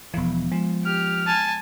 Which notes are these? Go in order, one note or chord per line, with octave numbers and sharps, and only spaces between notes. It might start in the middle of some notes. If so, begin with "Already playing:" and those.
E1 E3 F3 B3
F3 G#3
G4 F6
G#5 A5